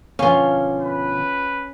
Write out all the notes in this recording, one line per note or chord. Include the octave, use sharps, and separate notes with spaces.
B2 D3 F3 C#4 F4 F5
B4